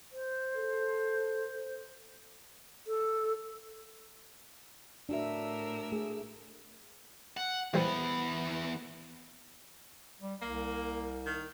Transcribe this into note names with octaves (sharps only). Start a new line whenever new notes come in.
C5
A4
A4
A2 D4 F#4 A#4 E5 E6
A3 G#4
F#5
E2 E3 G3 B3 C5
G3
C2 A#3
D#3